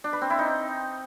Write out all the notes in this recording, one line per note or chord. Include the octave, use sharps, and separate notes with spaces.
D4
B4
C4
E4
D#4